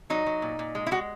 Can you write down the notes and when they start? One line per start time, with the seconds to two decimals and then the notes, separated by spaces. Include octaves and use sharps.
0.10 F#3 D#4
0.26 F#3
0.42 A#2
0.59 A#2
0.75 G#3
0.86 E4
0.91 G#3 F#4